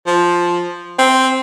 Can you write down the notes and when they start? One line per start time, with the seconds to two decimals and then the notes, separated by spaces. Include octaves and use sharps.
0.07 F3
0.99 C4